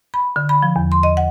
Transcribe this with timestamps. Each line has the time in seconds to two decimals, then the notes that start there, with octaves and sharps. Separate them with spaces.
0.14 B5
0.36 D3
0.49 B5
0.62 F3
0.76 E2
0.92 C6
1.03 D#5
1.17 F#5